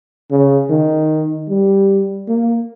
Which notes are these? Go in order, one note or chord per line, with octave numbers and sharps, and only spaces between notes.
C#3
D#3
G3
A#3